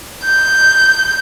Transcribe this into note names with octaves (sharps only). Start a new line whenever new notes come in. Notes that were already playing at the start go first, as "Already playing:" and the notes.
G6